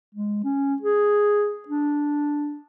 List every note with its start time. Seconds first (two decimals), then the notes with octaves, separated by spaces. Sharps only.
0.15 G#3
0.44 C#4
0.82 G#4
1.68 D4